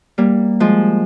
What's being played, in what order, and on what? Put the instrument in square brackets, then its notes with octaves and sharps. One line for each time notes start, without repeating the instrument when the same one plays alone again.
[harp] G3 A#3
F3 G#3